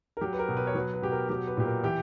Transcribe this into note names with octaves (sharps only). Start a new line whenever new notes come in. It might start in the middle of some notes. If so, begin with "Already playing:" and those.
A#4
F#3 G4
B4
A#4
B2
B4
C#5
F#3 B4
B4
B2 G4
A#4
F#3 G4
B4
A#2 G4
A#4
E3 G4